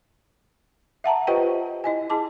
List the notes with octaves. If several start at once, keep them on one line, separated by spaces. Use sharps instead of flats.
E5 F#5 A5 A#5
F4 G4 B4 C5 D#5 G5
E4 D#5 G#5
E4 G#4 A5 D6